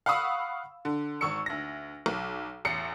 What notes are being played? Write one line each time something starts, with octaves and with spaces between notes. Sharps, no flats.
F5 F#5 B5 C#6 D#6 E6
D3
G#1 C#6 E6 C#7
D2 A#6
B1
A1 E2 C7 C#7